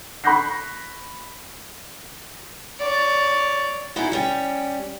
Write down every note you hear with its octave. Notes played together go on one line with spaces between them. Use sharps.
B5 C#6 F#6 G6 A#6 C7
C#5 D5
B3 D#4 E4 F#4 G#4
G3 C#4 G5